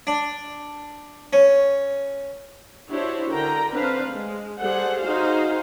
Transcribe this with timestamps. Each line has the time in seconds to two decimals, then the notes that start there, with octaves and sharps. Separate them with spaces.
0.07 D4
1.33 C#4
2.89 D4 E4 F#4 G4 C5 C#5
3.31 D3 A#4 G5 A#5
3.72 C4 D4 B4 C5 F5
4.09 G#3
4.59 G3 G#4 A4 C5 F#5
5.00 D#4 F#4 G#4 C5 F5